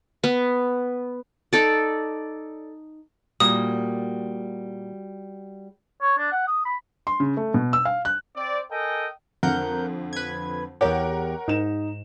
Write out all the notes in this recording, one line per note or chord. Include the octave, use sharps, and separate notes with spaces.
B3
D#4 A4 D5
A#2 G3 A#3 F#4 D#6
C#5
D4
F#5
D#6
B5
C6
C#3
A3
B2
E6
F5
F#6
C4 D5
A4 A#4 D#5 G5 G#5
F2 D3 A#4 F#5 G6
B4 G#6
E2 G4 A#4 C#5 F#5
G#2 D#4 E7